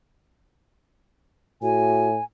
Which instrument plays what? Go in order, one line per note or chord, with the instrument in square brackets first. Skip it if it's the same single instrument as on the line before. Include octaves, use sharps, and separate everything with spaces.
[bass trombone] A2 [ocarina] F#4 [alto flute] G#5